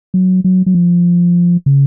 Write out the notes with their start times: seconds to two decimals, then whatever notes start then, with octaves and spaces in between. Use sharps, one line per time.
0.14 F#3
0.44 F#3
0.66 F#3
0.75 F3
1.66 C#3